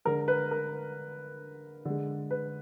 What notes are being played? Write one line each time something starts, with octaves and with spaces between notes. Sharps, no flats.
D3 G#3 A#4
B4
A#4
D3 G#3
B4